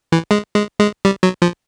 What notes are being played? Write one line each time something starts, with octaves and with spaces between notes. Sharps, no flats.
E3
G#3
G#3
G#3
G3
F#3
F3